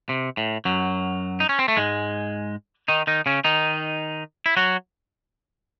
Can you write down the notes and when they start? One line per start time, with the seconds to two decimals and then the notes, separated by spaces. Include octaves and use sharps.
0.09 C3
0.37 A2
0.65 F#2 F#3
1.40 D#4
1.49 C#4
1.59 C4
1.68 A3
1.77 G#2 G#3
2.88 D#3 D#4
3.07 D#3 D#4
3.26 C#3 C#4
3.44 D#3 D#4
4.46 E4
4.57 F#3 F#4